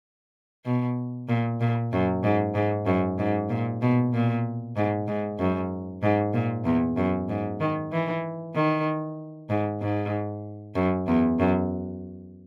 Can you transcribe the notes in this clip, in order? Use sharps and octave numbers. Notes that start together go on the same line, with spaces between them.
B2
A#2
A#2
F#2
G#2
G#2
F#2
G#2
A#2
B2
A#2
G#2
G#2
F#2
G#2
A#2
E2
F#2
G#2
D#3
E3
D#3
G#2
G#2
F#2
E2
F#2